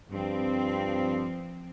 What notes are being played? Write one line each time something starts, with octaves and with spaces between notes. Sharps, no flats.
G2 F3 C4